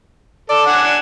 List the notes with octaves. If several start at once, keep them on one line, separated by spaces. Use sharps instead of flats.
A4 D5
D4 F#5 G#5